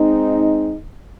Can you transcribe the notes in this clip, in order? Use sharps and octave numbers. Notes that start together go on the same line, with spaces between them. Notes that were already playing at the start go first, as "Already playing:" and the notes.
Already playing: G#3 C4 D#4